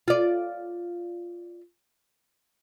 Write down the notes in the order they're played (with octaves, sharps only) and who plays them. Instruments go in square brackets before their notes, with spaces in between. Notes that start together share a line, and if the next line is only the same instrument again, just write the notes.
[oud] F4 D5